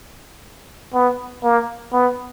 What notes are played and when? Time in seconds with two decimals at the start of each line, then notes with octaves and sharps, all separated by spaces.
0.94 B3
1.44 A#3
1.93 B3